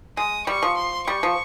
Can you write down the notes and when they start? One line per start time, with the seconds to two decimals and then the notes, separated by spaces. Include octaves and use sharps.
0.17 G#3 D#6
0.47 G3 C#6
0.63 F3
0.78 C6
1.08 G3 C#6
1.23 F3